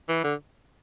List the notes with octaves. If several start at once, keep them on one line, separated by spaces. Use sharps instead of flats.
E3
D3